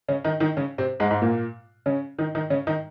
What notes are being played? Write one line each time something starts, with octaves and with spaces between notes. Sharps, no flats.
C#3 C#4
D#3 D#4
D#3 D#4
C#3 C#4
C3 C4
G#2 G#3
G#2 G#3
A#2 A#3
C#3 C#4
D#3 D#4
D#3 D#4
C#3 C#4
D#3 D#4